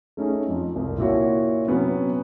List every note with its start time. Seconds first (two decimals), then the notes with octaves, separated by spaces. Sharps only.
0.17 A3 C#4 D#4 G#4
0.48 F2
0.76 C2
0.98 A#2 E4 F#4 C#5
1.67 C3 F#3 B3 C#4